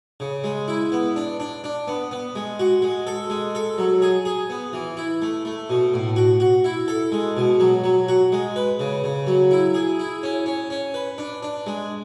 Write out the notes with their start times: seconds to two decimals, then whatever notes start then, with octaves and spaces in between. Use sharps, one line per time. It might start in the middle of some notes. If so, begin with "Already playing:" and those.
0.20 C#3
0.44 G#3
0.68 E4
0.92 B3
1.16 D4
1.40 D4
1.64 D4
1.88 B3
2.11 B3
2.36 G#3
2.59 F#4
2.82 G#3
3.07 A4
3.30 G#3
3.55 A4
3.78 F#3
4.02 G#4
4.25 G#4
4.50 B3
4.73 E3
4.97 E4
5.22 A3
5.45 A3
5.70 B2
5.94 A2
6.16 F#4
6.40 F#4
6.64 E4
6.88 A4
7.12 G#3
7.37 B2
7.60 F#3
7.84 F#3
8.08 F#4
8.32 G#3
8.56 B4
8.80 C#3
9.04 C#3
9.27 F#3
9.51 E4
9.74 G#4
9.99 E4
10.23 C#4
10.46 C#4
10.70 C#4
10.94 B4
11.18 D4
11.43 D4
11.66 G#3